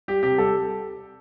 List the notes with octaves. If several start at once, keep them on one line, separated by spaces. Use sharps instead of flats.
G3 G4
C3 G4
G3 A4